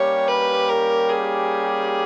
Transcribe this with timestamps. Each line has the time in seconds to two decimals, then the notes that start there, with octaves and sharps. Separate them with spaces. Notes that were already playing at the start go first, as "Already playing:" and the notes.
Already playing: G3 A#3 C#4 G4 C#5
0.28 B4
0.69 A#4
1.09 G#4